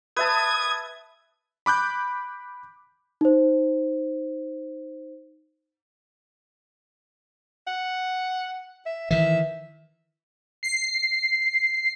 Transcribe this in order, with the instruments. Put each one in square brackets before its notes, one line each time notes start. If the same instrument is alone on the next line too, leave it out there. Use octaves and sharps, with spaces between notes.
[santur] B4 E5 A5 [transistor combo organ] D#6 [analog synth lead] G#6
[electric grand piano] B5 D6 F#6 G6
[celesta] D#4 C5
[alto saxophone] F#5
E5
[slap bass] D#3 E3 [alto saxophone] E5
[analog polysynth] C7